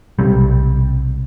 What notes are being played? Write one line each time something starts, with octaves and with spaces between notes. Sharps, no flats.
B1 C3 G3